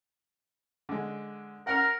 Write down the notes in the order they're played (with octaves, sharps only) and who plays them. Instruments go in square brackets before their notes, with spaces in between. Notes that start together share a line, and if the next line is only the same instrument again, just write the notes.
[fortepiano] D3 G#3
[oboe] A#4 [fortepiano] F#5 A#5 F6